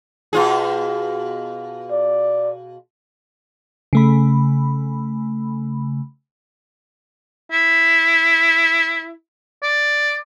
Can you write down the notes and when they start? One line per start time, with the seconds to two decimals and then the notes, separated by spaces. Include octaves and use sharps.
0.33 B2 F4 G#4
1.91 D5
3.93 C#3 A3 B5
7.52 E4
9.63 D5